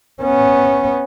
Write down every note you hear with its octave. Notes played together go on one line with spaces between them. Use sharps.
B3 C#4